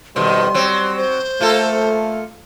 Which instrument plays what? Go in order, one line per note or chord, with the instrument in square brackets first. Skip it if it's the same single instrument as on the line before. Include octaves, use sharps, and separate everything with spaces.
[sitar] F2 B2 D#3 [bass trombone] G3 [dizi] C6
[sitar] F#3 C4
[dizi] C5
[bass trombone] A3 [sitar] A#3 F4 A4